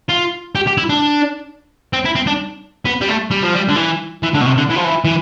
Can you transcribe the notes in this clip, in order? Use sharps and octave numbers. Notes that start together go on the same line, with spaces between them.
F4
G4
G4
E4
D4
C4
E4
C4
D4
B3
G3
A3
G3
F3
G3
D3
E3
E3
D3
B2
C3
D3
E3
F3
E3
E3